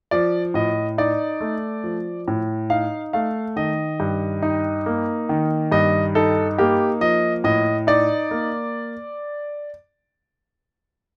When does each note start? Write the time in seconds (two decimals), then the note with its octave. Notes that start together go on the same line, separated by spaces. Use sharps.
0.11 F3 D5
0.54 A2 D#5
0.98 D#4 D5
1.41 A3
1.84 F3
2.28 A2
2.70 D#4 F5
3.13 A3 F5
3.56 D#3 D#5
4.00 G2
4.42 D#4
4.86 A#3
5.29 D#3
5.72 G2 D#5
6.15 D#4 A4
6.58 A#3 G4
7.01 F3 D#5
7.44 A2 D#5
7.87 D#4 D5
8.31 A#3